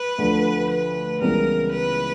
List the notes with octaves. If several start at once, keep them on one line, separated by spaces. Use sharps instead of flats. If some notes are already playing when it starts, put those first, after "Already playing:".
Already playing: B4
D2 D3 F3
B4
C#2 C#3 E3 G3 B3 A#4
B4